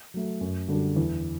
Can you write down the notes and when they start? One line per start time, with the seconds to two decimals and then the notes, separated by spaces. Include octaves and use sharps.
0.14 F#3 A3
0.41 F#2
0.68 D3 G3 D4 F#4
0.96 E2